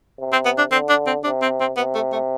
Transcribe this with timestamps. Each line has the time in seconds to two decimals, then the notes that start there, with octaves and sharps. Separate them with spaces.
0.19 C3
0.32 C4
0.45 B3
0.58 D4
0.71 D3 C4
0.89 D4
1.07 C4
1.24 C3 D4
1.42 C4
1.60 C4
1.77 C3 B3
1.94 A3
2.12 A3